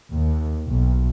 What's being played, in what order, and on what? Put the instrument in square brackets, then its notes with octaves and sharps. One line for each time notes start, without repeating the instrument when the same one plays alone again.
[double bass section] D#2
B1